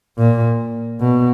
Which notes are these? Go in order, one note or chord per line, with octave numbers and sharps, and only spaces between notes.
A#2
B2